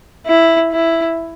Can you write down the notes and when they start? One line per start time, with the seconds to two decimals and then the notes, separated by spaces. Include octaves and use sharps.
0.27 E4
0.72 E4